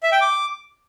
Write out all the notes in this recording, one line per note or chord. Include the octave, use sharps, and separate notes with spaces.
E5
G5
D6